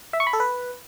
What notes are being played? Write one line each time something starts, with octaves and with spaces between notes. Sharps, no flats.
E5
C#6
B5
A4
B4